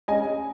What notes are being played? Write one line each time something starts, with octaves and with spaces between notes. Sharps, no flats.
G#3 C#4 D#5 G#5